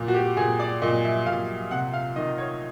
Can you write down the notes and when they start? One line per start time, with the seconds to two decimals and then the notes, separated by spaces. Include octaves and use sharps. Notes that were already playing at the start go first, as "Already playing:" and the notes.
Already playing: A#2
0.08 F#4
0.14 G4
0.37 A#2 G#4
0.60 D5
0.82 A#2 D#5
1.04 E5
1.26 A#2 F5
1.71 C3 F#5
1.93 F5
2.16 D#3 D#5
2.38 C#5